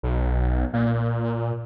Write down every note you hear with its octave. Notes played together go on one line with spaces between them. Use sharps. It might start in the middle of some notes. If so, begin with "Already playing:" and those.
B1
A#2